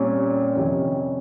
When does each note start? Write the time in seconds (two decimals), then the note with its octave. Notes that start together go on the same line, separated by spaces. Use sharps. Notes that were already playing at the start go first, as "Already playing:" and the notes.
Already playing: A#2 G3 C4 C#4
0.55 F2 C3 D#3